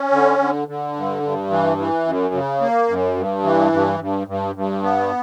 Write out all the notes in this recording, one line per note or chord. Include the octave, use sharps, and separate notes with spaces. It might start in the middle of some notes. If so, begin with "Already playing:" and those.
Already playing: C#4
D3
D3
D3
G2
G2
E3
E3
F#2
C#3
A#3
F#2
G2
E3
G2
G2
G2
G2
B3